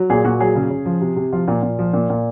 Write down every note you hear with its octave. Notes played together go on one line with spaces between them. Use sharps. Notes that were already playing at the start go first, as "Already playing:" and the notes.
Already playing: F#3
A#2 G#4
A#2 F#4
F#3 G#4
C#3
C#3
F3
C3
C3
F3 F4
A#2
A#2
F3
A#2
A#2